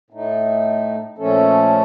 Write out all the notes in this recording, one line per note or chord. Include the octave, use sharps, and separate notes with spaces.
A2 A3 D#4
A#2 F3 A3 C#4 A4